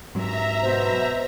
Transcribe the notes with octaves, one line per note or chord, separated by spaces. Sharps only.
G#2 F#3 E5 A#5
B2 B3 C5